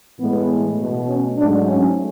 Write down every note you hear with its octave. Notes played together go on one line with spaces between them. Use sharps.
A2 E3 G#3 B3
B2 A3
C#4
G#2 F#3 A3 D4
C#4